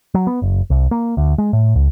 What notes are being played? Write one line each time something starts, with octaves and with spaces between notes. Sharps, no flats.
F#3
B3
F#1
C2
A#3
D2
G#3
A2
C#2